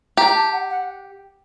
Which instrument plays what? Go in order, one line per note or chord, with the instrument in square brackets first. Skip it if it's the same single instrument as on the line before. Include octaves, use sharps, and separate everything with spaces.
[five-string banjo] G4 [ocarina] A#5
[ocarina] A5
F#5
F#5